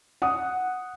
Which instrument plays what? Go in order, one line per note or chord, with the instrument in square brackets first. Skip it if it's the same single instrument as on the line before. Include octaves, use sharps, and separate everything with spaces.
[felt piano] F#5 D#6